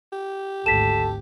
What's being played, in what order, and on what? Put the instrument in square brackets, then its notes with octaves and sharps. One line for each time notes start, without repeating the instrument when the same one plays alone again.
[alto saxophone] G4
[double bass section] G#1 D2 [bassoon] A4 [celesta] B6 E7